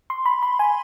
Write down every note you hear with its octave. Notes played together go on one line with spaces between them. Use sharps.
C6
B5
B5
G#5